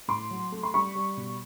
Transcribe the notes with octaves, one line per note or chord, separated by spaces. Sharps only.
A2 C6 D6
F#3
A3
C6
G3 B5 C#6
G3
B2